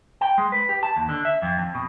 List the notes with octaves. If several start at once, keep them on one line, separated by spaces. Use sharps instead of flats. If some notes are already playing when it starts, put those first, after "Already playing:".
G5
G#3
B4
G4
A5
D#2
D3
E5
F2
F2
B2